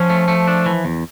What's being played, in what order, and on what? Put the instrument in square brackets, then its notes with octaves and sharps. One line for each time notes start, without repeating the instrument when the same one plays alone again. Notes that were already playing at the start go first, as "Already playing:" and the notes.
Already playing: [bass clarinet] F3 [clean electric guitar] C#4
[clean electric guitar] A3
A3
D4
E3
E2